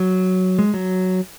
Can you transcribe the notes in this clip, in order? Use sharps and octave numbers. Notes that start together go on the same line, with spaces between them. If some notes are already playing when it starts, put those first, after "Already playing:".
Already playing: F#3
G#3
F#3